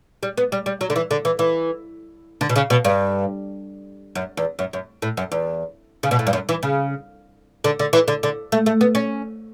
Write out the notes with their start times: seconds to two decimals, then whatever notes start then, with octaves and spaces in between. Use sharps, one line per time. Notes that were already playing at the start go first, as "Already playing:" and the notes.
0.23 G3
0.38 B3
0.52 G3
0.66 G3
0.81 F#3
0.90 D3
0.96 E3
1.11 D3
1.25 E3
1.39 E3
2.41 D3
2.49 B2
2.56 C#3
2.70 B2
2.85 G2
4.15 F#2
4.37 E2
4.59 F#2
4.73 F#2
5.02 A2
5.17 F#2
5.32 E2
6.03 C#3
6.11 B2
6.19 A2
6.27 G2
6.33 F#2
6.49 E3
6.63 C#3
7.64 D3
7.79 D3
7.93 E3
8.08 D3
8.23 D3
8.52 A3
8.66 A3
8.81 B3
8.95 C#4